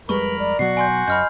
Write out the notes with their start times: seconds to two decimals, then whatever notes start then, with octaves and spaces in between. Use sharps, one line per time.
0.09 F2 G3 G#3 A#4 B4 B5 C#6
0.39 D5
0.59 B2 F#3 F#4 C7
0.77 G#5 C6 G6
1.08 F#2 D#5 B5 F6 G6